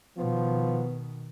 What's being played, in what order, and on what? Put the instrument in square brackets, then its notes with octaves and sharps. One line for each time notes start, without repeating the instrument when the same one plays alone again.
[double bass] B2 D#3 [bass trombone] F3 [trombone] B3